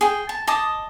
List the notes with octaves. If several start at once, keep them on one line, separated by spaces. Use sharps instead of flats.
G#4 G5
A5
D#5 A5 D6 D#6